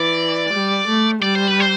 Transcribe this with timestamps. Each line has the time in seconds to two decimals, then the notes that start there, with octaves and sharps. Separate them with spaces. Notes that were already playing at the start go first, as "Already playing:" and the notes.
Already playing: E3 D5
0.54 G3
0.88 A3
1.22 G3 D5
1.35 C5
1.48 B4
1.60 C5